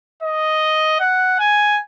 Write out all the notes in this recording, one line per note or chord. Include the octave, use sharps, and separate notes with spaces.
D#5
F#5
G#5